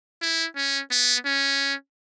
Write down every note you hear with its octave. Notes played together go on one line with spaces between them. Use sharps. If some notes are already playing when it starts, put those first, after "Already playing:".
E4
C#4
B3
C#4